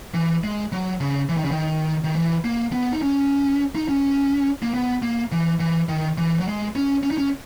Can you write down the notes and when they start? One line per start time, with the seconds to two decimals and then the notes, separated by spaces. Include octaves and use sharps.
0.14 E3
0.44 G#3
0.72 F#3
1.00 C#3
1.29 E3
1.37 D#3
1.44 C#3
1.51 D#3
2.04 D#3
2.16 E3
2.45 A#3
2.72 B3
2.92 D#4
3.02 C#4
3.75 D#4
3.88 C#4
4.63 A#3
4.74 B3
5.02 A#3
5.32 E3
5.60 E3
5.89 D#3
6.18 E3
6.40 F#3
6.47 G#3
6.76 C#4
7.03 C#4
7.11 D#4
7.18 C#4